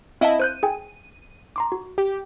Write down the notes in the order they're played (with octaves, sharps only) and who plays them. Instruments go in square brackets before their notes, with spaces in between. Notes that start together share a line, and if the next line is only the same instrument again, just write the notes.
[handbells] C4 F5 A5 [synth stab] E4 D#5
[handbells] C5 F#6 G6 [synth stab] D#7
[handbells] G#4 G5 G#5
A#5 C6 D6
F#4
[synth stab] G4